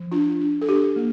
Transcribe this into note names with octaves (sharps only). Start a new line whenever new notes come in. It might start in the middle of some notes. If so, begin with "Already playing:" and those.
Already playing: F3
D4 F4
D4
A4
D4 G4
A#3